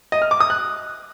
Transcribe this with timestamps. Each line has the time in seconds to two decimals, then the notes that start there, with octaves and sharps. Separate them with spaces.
0.12 D#5
0.22 F6
0.31 D6
0.41 D#6
0.50 F#6